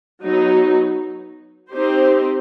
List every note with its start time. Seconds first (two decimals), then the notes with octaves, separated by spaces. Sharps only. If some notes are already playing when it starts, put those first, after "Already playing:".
0.21 F#3 B3 D#4
1.70 C4 D#4 G4 C5